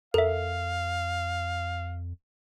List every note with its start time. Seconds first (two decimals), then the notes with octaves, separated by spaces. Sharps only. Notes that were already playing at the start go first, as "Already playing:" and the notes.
0.14 F2 A4 A#4 E5 F5